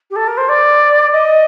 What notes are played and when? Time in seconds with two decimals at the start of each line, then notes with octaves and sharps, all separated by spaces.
0.10 G4
0.16 A4
0.27 A#4
0.37 C5
0.49 D5
1.12 D#5